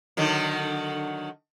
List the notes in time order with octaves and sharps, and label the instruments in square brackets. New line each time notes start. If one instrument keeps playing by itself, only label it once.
[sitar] D3 D#3 F#3